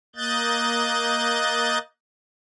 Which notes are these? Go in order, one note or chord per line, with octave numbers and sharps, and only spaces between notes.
A#3 D#5 F#6 G6 A6